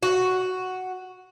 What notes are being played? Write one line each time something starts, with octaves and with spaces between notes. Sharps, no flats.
F#4